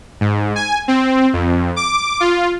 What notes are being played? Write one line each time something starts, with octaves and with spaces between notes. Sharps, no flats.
G#2
G#5
C4
F2
D6
F4